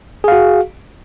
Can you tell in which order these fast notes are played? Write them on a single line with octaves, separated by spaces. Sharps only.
G#4 F5 F#4